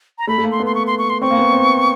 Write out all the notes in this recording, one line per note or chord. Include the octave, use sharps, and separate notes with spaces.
A#5
A3 B5
A3
A#3
C6
B3
C6
C#6
C6
C#6
C6
C4 C#6
A#3
B3
C4